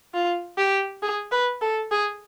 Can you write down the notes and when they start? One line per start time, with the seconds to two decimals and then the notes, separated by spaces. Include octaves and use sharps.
0.14 F4
0.58 G4
1.02 G#4
1.32 B4
1.62 A4
1.91 G#4